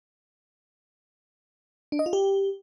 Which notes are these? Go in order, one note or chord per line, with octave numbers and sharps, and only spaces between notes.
D4
D#5
F4
G4